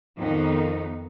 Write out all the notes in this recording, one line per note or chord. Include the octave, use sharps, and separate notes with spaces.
F2 D#3 B3 D#4